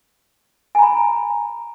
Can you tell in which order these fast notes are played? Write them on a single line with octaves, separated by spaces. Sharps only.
G#5 A#5 B5